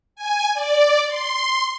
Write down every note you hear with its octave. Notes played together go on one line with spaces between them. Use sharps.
G#5
D5
C6